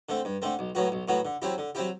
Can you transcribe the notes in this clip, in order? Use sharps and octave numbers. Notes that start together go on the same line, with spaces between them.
D3 A3 C4
G2
D3 A3 C4
B1
A2 F#3 B3 F#4
B1
A2 F#3 B3 F#4
D3
F#3 C4 E4 G4
D3
F#3 C4 E4 G4